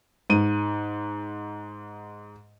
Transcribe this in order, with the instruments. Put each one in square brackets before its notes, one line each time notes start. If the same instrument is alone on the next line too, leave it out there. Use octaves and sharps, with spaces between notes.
[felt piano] G#2 D#7